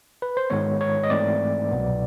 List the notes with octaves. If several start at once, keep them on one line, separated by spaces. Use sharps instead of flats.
B4
C5
G#2 D#3 G#3 B3 C#5
C#5
D#5
G#2 E3 A3 C4 D5
C2 B2 F#3 B3